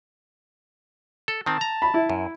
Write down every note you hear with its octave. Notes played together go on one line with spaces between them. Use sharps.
A4
D#3 C4 A5
A#5
B5
E4
F#2